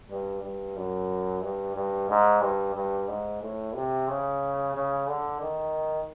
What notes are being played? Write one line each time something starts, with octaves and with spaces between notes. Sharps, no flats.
G2
G2
F#2
G2
G2
G#2
G2
G2
G#2
A2
C3
C#3
C#3
D3
D#3